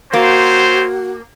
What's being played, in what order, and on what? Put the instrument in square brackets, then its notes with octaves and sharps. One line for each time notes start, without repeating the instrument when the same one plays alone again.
[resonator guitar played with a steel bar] A#3 [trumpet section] C4 C#4 C5 [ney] F#4